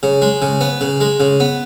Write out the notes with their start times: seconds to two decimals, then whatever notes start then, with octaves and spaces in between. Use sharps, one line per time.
0.03 C#3
0.22 G#3
0.42 C#3
0.61 B3
0.81 C#3
1.01 G#3
1.20 C#3
1.40 B3